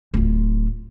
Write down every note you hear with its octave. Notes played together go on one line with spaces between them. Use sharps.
D1 F4